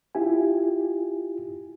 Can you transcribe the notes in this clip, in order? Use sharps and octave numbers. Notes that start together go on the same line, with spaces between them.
E4 F4 G4 G#5